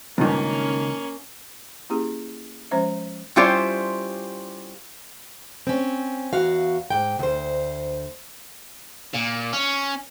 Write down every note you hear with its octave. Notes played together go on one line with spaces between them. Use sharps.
C#2 G2 A#2 D#3 A#3 C#4
A#3 C#4 E4 G4 G#4
F3 G#3 C#4 C5 E5
G3 C#4 E4 F4 G4 C5
C4 C#4
E2 F#4 F5
G#2 G5
D2 C5
A#2
C#4